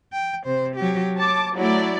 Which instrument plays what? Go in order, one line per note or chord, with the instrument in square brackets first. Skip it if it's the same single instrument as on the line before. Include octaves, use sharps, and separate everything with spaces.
[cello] G5
C3 C5
F#3 G4
[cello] C#5 [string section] A5 D6
[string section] F#3 A3 D5 [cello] E4